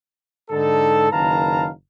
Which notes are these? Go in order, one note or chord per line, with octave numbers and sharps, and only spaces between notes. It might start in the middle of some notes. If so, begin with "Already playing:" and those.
G#2 D3 D#4 A4
F#1 D#3 B4 F5 A5 A#5